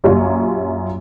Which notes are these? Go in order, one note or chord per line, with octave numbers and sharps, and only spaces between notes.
A#1 F#2 F#3 G3 F4 C#5